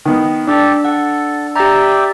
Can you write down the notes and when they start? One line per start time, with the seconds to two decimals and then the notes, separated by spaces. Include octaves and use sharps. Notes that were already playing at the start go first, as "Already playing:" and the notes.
0.05 D#3 B3
0.47 D4 G4 A4
0.84 A4 F#5
1.56 G4 D5 E5 G5 A#5